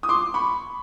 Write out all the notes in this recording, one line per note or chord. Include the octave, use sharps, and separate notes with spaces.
D#6
C6 D6
B5 C#6